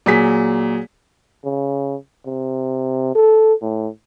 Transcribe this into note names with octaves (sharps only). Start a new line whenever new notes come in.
A#2 F#3 G#4 B6
C#3
C3
A4
A2